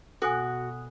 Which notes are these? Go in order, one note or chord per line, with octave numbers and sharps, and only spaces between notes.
B2 F#4 A4 F#5 G#5 D#6 F#6